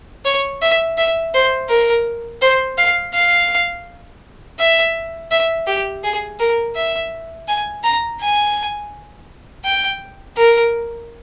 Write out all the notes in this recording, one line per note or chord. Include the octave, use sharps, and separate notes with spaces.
C#5
E5
E5
C5
A#4
C5
F5
F5
E5
E5
G4
G#4
A#4
E5
G#5
A#5
G#5
G5
A#4